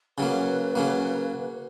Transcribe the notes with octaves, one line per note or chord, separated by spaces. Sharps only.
C#3 F#3 A#3 B4
C#3 F#3 A#3